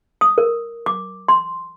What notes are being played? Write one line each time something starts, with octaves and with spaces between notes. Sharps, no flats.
D#6
A#4
D6
C6